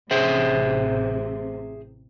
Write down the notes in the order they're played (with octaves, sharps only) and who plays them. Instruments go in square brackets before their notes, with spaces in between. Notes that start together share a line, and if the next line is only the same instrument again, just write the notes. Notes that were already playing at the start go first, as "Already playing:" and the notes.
[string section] A1 C3 [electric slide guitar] G#4 C5 E5